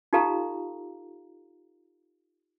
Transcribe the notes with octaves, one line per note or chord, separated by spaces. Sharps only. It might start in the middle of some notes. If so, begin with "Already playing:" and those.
D#4 F4 G4 A4 F5 A#5